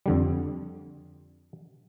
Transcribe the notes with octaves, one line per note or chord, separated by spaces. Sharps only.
F2 D3 G3